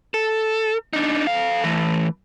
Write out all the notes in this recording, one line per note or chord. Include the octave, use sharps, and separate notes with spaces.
A4
D4 D#4
A4 F5
E3 A3